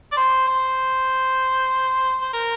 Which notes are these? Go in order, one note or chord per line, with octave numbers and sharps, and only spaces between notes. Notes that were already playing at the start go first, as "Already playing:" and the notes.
D5
C5
C5
C5
A#4